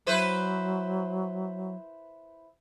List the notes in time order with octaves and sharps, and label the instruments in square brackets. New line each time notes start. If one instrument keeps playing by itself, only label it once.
[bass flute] F#3 [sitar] E4 B4 C5